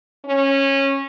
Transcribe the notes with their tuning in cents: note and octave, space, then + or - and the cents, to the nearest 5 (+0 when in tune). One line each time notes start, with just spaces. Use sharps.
C#4 -15